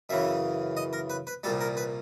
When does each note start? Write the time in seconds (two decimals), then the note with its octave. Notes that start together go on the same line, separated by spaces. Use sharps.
0.09 F#2 C#3 E3 E5
0.77 D#5
0.93 A#4
1.10 B4
1.27 B4
1.44 C2 A#2 G3 A4
1.61 A#4
1.77 B4